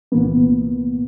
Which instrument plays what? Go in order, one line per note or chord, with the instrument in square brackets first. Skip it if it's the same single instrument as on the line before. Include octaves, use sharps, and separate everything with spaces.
[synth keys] C2 A#2 E3 A#3 B3